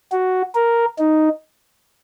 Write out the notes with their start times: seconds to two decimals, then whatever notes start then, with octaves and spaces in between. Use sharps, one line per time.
0.12 F#4
0.55 A#4
0.99 D#4